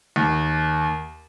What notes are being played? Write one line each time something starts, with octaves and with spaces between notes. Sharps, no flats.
D#2